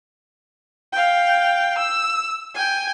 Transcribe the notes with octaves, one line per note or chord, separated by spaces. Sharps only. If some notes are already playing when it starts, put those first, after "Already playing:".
F5 G5
E6
G5 G#5